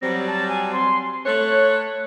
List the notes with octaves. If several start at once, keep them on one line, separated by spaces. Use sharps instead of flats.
F#3 G3 C4 A#6
A5
G#5
C6
A3 C#5 F#6